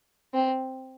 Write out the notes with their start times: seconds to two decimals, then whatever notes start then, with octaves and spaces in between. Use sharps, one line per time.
0.34 C4